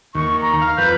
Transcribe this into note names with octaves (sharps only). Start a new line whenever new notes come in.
D#2 C#6
A#5
F5
F2 B4 G6